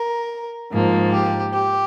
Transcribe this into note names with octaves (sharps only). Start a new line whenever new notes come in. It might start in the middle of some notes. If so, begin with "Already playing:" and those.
Already playing: A#4
G#2 F3 A#3
G4
G4